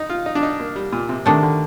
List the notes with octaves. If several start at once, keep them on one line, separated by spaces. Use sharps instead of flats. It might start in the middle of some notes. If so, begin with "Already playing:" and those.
Already playing: D#4
F4
D#4
D4
D#4
A#3
G3
A#2
C3
C3 D#3 A3 D4
D3